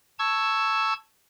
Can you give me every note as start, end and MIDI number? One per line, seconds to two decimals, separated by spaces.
0.19 0.93 81
0.19 0.93 85
0.19 0.93 88
0.19 0.93 92